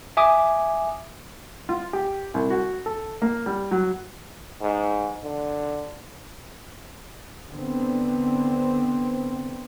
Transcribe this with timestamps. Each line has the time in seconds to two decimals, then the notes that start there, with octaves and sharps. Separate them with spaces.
0.17 E5 G#5 D6 D#6
1.69 F4
1.93 G4
2.34 C2
2.50 F#4
2.86 A4
3.22 A#3
3.46 G3
3.71 F#3
4.62 G#2
5.24 D3
7.49 D3 B3 C4